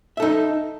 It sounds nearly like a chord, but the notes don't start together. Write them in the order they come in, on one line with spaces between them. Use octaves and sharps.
E5 A4 D#4